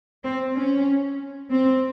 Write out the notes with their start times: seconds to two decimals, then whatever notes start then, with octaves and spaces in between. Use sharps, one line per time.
0.24 C4
0.55 C#4
1.50 C4